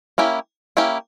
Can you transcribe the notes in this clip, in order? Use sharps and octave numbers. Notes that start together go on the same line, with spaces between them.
A#3 C#4 E4 G4
A#3 C#4 E4 G4